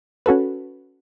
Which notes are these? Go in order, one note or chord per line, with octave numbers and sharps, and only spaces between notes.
C#4 F#4 A4 B4